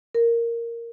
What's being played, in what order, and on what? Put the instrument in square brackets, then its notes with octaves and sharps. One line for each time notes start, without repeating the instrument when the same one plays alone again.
[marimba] A#4